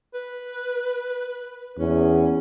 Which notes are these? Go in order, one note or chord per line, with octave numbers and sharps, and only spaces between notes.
B4
E2 C#4